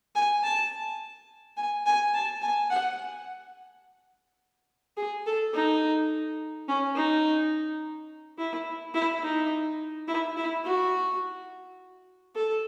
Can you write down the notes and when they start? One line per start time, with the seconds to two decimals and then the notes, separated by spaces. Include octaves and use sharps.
0.15 G#5
0.43 A5
1.57 G#5
1.86 G#5
2.14 A5
2.42 G#5
2.70 F#5
4.97 G#4
5.26 A4
5.54 D#4
6.68 C#4
6.96 D#4
8.38 E4
8.94 E4
9.23 D#4
10.08 E4
10.37 E4
10.65 F#4
12.35 A4